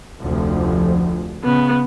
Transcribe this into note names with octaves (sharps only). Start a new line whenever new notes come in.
F1 D2 F3
C#3 B3